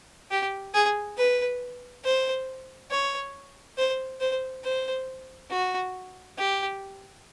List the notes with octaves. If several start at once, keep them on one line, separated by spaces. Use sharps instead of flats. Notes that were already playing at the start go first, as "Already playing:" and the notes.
G4
G#4
B4
C5
C#5
C5
C5
C5
F#4
G4